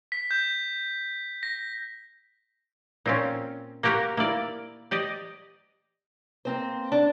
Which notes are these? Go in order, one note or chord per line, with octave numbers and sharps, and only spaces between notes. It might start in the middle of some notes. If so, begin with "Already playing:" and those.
B6
G6
A#6
A#2 C4 C#4
A#3 F#4 G4 A#4
A#3 E4 D5
G4 D5 D#5
A#3 C4 C5
D4